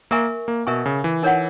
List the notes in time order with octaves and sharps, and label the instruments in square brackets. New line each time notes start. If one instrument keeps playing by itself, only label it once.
[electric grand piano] A#3 [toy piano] A#4 E5 G#5 C#6
[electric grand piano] A#3
[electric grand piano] B2 [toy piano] A#4 E5 G#5 C#6
[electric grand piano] C#3
E3
[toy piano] D#4 A#4 C#5 F#5